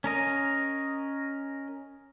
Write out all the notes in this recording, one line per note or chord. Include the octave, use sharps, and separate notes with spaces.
C#4 A#4 D#5